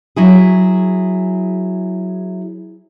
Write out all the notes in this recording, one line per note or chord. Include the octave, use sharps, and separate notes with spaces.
F#3 E4 G#4